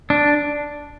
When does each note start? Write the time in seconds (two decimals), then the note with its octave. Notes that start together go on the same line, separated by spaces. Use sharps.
0.10 D4